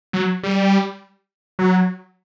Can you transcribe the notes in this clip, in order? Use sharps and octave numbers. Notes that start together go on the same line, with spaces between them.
F#3
G3
F#3